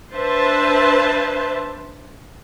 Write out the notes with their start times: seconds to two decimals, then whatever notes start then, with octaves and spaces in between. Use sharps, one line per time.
0.14 D4 B4 C5 E5 A5